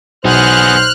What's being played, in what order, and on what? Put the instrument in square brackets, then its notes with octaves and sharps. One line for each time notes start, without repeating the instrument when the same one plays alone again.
[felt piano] B1 [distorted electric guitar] B3 G#4 [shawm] C5 [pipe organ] F6 F#6